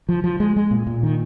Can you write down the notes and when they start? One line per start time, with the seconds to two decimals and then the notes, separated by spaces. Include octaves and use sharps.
0.09 F3
0.24 F3
0.40 G#3
0.56 G#3
0.71 A#2
0.87 A#2
1.03 D#3